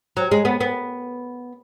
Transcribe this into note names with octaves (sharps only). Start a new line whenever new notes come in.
F#3
G#3
B3
B3